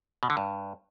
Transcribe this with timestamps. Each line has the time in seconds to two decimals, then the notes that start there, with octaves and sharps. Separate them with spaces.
0.23 B2
0.30 D3
0.37 G2